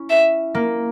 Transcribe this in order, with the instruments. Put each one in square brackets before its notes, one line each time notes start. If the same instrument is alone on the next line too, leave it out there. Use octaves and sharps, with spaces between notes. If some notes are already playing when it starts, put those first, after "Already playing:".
Already playing: [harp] C#4 E4
[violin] E5
[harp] A#3